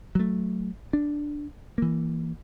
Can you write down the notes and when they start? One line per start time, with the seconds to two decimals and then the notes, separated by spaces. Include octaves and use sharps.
0.15 F#3 A3
0.93 D4
1.78 E3 A#3